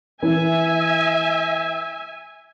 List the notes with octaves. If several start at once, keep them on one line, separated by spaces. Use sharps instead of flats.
E3 E5 G#5